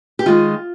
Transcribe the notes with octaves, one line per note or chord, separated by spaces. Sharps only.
G4
D#3 G#3 F4